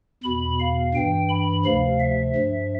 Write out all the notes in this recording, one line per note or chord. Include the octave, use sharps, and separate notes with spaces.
E2 B2 B5
F5
G2 E3 G5
B5
D2 C3 F3 F5
E5
G2 F3